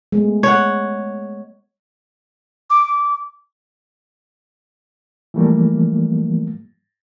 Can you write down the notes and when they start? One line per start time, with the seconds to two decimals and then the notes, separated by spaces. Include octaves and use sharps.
0.12 G#3 A3 B3
0.43 C#5 F#5
2.70 D6
5.34 E3 F3 G3 A3 A#3